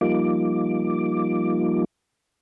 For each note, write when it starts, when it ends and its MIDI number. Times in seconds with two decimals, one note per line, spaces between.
0.01 1.84 53
0.01 1.84 55
0.01 1.84 58
0.01 1.84 63
0.01 1.84 65
0.01 1.84 86